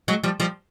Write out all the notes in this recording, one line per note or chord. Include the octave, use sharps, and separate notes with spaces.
F#3 G#3
F3 G3
F3 G3